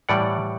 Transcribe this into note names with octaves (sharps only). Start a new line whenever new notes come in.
A2 E3 G3 D5 F#5